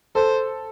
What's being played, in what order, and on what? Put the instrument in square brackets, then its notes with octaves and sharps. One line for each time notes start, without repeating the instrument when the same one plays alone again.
[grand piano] A4 [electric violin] C5